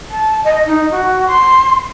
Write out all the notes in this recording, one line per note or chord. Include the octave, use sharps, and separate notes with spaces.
A5
D#5
D#4
F#4
C6